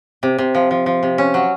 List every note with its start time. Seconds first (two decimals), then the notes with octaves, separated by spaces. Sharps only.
0.23 C3
0.38 C3
0.55 F3
0.71 F3
0.86 F3
1.03 C3
1.18 C#4
1.34 F#3